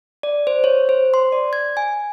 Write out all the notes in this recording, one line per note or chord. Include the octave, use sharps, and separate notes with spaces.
D5
C5
C#5
C5
C6
D5
G#6
G#5